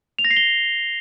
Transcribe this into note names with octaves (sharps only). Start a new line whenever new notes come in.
F7
A#6
C7
G7